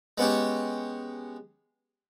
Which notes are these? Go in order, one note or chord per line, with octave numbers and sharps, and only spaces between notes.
G#3 B3 C#4 G4